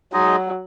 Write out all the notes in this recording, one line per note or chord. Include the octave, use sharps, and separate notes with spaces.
F#3 G#3 D#4 G#4 D#5